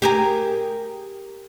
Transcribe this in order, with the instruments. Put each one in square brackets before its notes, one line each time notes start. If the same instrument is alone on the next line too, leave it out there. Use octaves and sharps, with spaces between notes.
[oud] G4 G#4 A#4